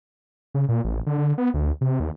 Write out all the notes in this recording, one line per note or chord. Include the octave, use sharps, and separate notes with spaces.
C#3
A#2
A1
D3
D3
B3
D2
C3
D#2